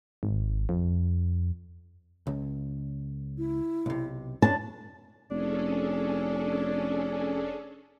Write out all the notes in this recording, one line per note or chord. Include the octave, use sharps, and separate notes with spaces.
G#1
F2
C#2
E4
B1 C3
F#2 A2 D4 C#5 A5
F1 C#4 D4 G#4 A4